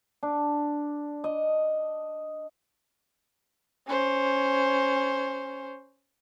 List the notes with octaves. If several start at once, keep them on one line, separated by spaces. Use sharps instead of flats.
D4
D#5
C#4 C5